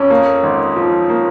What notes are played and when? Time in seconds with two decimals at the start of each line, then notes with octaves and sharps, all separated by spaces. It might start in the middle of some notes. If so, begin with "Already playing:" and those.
Already playing: F2 C#4
0.10 A#3
0.43 G#1
0.76 F3
1.10 A#3